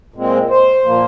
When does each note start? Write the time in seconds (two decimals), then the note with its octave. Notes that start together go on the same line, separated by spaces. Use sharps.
0.14 A#2 G#3 C4
0.50 C5
0.85 A#2 F3 A#3